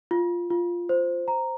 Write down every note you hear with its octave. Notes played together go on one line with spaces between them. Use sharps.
F4
F4
C5
A#5